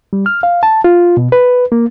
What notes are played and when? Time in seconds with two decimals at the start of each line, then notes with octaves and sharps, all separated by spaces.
0.13 G3
0.26 F6
0.43 F5
0.63 A5
0.84 F4
1.17 B2
1.32 B4
1.72 A#3